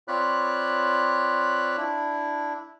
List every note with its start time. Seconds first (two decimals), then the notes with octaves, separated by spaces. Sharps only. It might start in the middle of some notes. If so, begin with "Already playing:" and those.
0.08 C4 F4 C#5 D5 B5 F#6
1.77 D4 E4